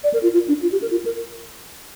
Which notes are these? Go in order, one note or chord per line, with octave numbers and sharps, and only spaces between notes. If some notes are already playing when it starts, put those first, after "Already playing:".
D5
A#4
F4
F4
D4
F4
G4
A#4
F4
A#4